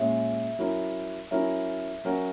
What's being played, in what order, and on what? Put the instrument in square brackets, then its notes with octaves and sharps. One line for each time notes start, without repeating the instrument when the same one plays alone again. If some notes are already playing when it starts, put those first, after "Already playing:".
Already playing: [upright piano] A#2 G#3 C#4 G#4 [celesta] E5
[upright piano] F#3 C#4 E4 A#4
[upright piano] F#3 C#4 E4 A#4 [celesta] E5
[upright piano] F#3 C#4 F#4 A#4